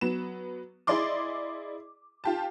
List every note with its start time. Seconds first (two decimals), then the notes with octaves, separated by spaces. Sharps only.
0.01 F#3 B3 E7
0.87 E4 G#4 D5 D#5 C6 D6
2.24 F4 G4 A5